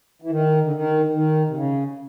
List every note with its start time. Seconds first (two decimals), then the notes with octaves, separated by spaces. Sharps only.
0.22 E3
0.30 D#3
0.64 D3
0.73 D#3
1.14 D#3
1.49 C3
1.55 C#3